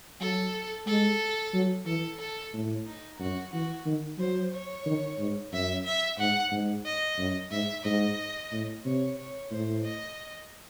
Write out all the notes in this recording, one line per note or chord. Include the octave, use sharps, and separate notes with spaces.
F#3 A4
G#3 A4
F#3
E3 A4
A4
A2
D#4
F#2 F#4
E3 F#4
D#3
F#3 C5
C#5
D#3
G#2
F#2 E5
E5
G#2 F#5
G#2
D#5
F#2
G#2 E5
G#2 D#5
A2
C3 C#5
C#5
A2 C5
D#5